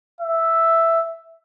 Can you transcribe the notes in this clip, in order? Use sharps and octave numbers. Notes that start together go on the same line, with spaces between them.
E5